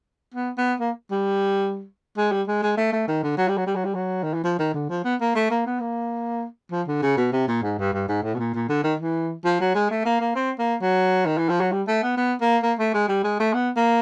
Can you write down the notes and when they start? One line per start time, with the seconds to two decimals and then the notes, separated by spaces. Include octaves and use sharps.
0.34 B3
0.58 B3
0.80 A#3
1.11 G3
2.17 G#3
2.32 G3
2.48 G#3
2.63 G#3
2.77 A3
2.93 A3
3.08 D#3
3.23 D3
3.37 F#3
3.48 G3
3.57 F#3
3.67 G3
3.75 F#3
3.85 G3
3.94 F#3
4.23 D#3
4.34 E3
4.44 F3
4.59 D#3
4.74 D3
4.89 F3
5.04 B3
5.21 A#3
5.35 A3
5.50 A#3
5.66 B3
5.80 A#3
6.71 F3
6.87 D3
7.02 C#3
7.17 B2
7.32 C3
7.48 A#2
7.63 G#2
7.78 G2
7.93 G2
8.08 G#2
8.23 A2
8.34 B2
8.39 A#2
8.54 A#2
8.69 D3
8.83 D#3
9.00 E3
9.45 F3
9.60 F#3
9.75 G#3
9.90 A3
10.05 A#3
10.20 A#3
10.35 C4
10.59 A#3
10.81 F#3
11.26 D#3
11.38 E3
11.49 F3
11.61 F#3
11.72 G3
11.88 A3
12.03 B3
12.17 B3
12.41 A#3
12.63 A#3
12.79 A3
12.94 G#3
13.08 G3
13.24 G#3
13.40 A3
13.54 B3
13.76 A#3